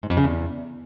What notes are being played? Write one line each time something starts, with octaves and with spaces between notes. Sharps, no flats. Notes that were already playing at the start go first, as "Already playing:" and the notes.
G#2
F2
C#3
E2